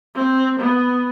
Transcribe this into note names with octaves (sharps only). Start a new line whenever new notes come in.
C4
B3